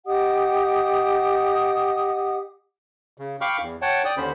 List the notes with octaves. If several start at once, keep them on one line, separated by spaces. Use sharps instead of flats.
G4 D#5 F#5 D#6
C#3
F5 G5 B5 C#6 D6 F6
E2
C#5 F#5 G5 A5
D5 G5 D#6
D#2 D3 C#4 C5 B5